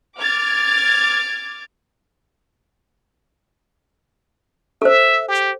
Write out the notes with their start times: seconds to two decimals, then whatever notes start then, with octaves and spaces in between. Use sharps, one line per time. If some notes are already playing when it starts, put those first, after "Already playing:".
0.18 D6 F6 G#6 A6
4.82 A4 C5 E5
5.28 G4